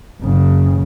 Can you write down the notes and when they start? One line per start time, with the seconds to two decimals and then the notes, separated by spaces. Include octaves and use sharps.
0.21 F#1 C#3